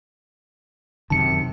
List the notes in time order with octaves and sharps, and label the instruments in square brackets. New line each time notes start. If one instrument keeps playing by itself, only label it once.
[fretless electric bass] F#2 C3 D#3 [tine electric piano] A5 C#7